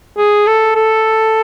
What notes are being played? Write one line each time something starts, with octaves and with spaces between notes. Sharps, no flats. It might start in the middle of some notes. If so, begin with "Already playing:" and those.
G#4
A4
A4